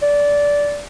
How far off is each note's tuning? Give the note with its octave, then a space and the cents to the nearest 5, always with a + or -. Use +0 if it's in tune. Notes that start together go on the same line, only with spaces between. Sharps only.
D5 -15